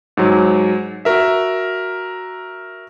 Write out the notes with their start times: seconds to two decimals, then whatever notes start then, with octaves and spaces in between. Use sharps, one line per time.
0.17 G#2 F#3
1.05 F#4 A#4 E5